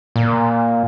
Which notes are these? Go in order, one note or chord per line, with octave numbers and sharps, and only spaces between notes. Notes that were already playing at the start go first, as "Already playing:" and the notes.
A#2